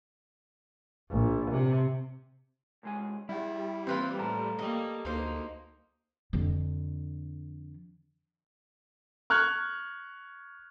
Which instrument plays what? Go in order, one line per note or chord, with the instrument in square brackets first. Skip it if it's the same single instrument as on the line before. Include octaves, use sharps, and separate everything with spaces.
[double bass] A#1
C3
[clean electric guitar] C2 G#3 G#5
[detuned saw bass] G3 [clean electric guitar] E4 F#5
[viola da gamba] E3 A#3 [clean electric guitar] C4 [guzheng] F4 B4 C5
[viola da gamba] A2 [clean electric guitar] A4 A5 A#5
[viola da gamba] G3 A#3 [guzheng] D#5
[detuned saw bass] D2 [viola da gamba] A#3 [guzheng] D#4 C5
[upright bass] F2 D3
[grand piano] C#6 F6 F#6 G#6